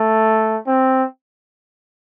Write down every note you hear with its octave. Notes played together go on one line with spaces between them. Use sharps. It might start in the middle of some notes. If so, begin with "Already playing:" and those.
Already playing: A3
C4